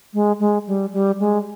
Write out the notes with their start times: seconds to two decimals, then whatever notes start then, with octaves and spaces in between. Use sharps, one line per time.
0.14 G#3
0.40 G#3
0.67 G3
0.93 G3
1.20 G#3